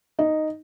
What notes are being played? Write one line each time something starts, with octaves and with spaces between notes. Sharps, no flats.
D#4